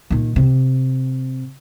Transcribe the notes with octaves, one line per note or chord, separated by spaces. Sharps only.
A#2 D#3
C3